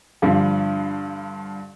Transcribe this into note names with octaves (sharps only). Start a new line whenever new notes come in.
G2 D3 F3